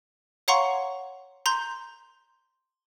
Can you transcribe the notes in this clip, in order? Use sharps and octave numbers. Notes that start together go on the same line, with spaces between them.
C#5 F5 F#5 A#5 C6 C#6
A#5 C6 G6